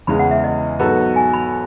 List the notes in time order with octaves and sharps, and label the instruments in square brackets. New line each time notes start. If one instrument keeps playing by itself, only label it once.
[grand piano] E2 C#3 E3 G#3 [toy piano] B5
[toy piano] F#5
E5
D#5
[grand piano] G#2 F#3 B3 F#4 A4
[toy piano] G#5
B5